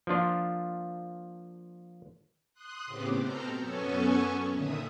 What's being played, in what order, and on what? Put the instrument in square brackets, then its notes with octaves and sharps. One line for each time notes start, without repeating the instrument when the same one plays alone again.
[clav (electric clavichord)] F3 A#3 D4 F4
[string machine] C6 D#6 F#6
A2 C#3 B3 C4 G4 D6
B2 C4 A4 A#5 F6 G6
F#2 B3 C#4 A4 G#5 C#6
A#2 D3 D#3 E5 D#6